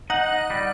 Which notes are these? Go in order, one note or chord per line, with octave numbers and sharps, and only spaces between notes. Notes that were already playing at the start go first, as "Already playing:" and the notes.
D#4 F#5
G3